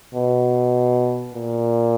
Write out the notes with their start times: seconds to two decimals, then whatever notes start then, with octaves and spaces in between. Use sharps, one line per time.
0.14 B2
1.34 A#2